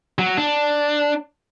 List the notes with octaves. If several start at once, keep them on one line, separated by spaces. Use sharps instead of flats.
F#3
D4